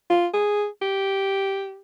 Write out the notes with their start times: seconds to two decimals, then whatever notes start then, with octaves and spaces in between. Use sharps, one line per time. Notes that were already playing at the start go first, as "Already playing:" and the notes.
0.10 F4
0.33 G#4
0.82 G4